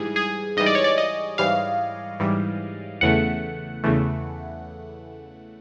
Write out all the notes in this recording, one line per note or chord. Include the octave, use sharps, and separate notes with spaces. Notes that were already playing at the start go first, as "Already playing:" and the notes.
Already playing: G#2 E3 G3 G#4
G#4
G#2 E3 G3 D#5
D5
C#5
D5
D#5
G#2 E3 G3 F5
G#2 E3 G3
E2 C#3 E3 A3 F#5
E2 C#3 E3 A3